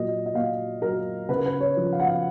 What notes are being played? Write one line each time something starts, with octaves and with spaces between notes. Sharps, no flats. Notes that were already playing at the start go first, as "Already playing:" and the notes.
Already playing: A#2 F#3 D#5
D#5
A#2 F5
F#3 A#4
C#3 B4
A#4
B4
C#5
F3
F5
F#5
F5